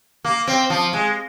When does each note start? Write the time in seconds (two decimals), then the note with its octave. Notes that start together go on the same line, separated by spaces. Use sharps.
0.25 A#3
0.47 C4
0.70 F3
0.93 G#3